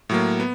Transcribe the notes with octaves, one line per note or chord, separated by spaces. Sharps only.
A2 F#3 A#3
B3